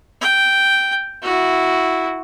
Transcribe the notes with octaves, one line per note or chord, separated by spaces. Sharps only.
G5
E4 F#4